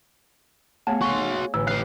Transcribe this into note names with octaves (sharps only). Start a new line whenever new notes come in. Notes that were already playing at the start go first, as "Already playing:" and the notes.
A3 B3 G#4 C#5 F5 A5
F#4 C6 C#6
A1 D3 E6
G4 F5 F#6 C7